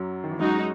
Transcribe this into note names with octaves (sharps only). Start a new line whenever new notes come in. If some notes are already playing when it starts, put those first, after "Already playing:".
Already playing: F#2 F#3
D#3
E3
F#2 F#3 G#3 D#4 F#4